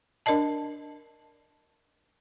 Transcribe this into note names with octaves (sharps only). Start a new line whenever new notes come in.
D4 A#4 D5 D#5 A5